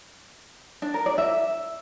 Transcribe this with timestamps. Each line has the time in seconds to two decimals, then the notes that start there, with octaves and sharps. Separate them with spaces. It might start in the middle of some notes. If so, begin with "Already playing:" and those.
0.82 D4
0.94 A#4
1.06 D5
1.18 E5